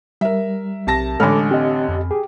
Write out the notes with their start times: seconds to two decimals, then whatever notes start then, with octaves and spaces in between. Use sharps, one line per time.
0.21 G3 A#4 E5
0.87 B1 C3 A5 A#6
1.20 A1 D3 G#3 A4 G#5 B5 D6 F6
1.51 C4 G4 D#5
1.88 F2
2.11 G4 G#4